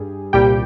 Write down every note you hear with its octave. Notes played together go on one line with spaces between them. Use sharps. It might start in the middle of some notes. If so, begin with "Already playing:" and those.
Already playing: G2 G3 G#4
C2 A#2 G3 G4 G5